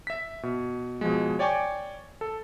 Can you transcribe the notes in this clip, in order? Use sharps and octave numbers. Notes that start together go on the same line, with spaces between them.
E5 B6
B2
B2 F3 G#3
C#5 D5 G5 G#5 C#6 D6
A4